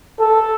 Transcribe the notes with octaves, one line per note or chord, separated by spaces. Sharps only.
A4